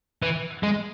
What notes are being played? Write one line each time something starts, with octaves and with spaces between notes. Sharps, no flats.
E3
G#3